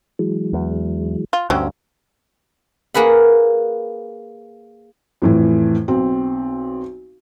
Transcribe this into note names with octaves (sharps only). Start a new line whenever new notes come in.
E3 F#3 G#3
E2
F4
D2 G2 F#3 C4 C#4
A#3 G#4 B4 F#5
F2 A2 E3
B1 C4